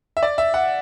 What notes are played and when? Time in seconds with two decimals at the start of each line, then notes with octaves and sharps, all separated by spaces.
0.17 E5
0.23 D5
0.38 E5
0.54 F#5